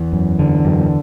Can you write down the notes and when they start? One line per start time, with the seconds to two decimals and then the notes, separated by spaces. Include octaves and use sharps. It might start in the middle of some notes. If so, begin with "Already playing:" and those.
Already playing: E2 E3
0.13 F#2
0.39 D3
0.65 F#2